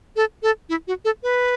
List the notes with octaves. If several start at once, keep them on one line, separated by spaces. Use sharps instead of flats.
A4
A4
E4
F#4
A4
B4